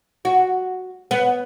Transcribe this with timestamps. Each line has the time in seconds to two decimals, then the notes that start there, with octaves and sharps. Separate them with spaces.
0.25 F#4
1.11 B3